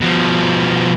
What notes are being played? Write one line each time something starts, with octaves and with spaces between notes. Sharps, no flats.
B2 F3